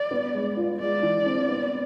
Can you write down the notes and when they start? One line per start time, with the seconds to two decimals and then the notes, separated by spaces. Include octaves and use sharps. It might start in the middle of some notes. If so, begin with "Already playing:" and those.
Already playing: D5
0.11 B3
0.34 G#3
0.57 F4
0.80 G#3 D5
1.03 E3
1.26 C4
1.48 B3